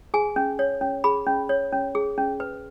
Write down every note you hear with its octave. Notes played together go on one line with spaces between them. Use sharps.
G#4 G#5
C#4
C#5
C#4
G#4 B5
C#4
C#5
C#4
G#4
C#4
B4